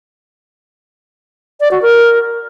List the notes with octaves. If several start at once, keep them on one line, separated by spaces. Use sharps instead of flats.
D5
F#4
A#4